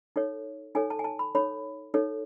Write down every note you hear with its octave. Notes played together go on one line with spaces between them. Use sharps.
D#4 A4 C#5
D#4 A4 C#5 G#5
A5
G#5
A5
B5
D#4 A4 C#5 B5
D#4 A4 C#5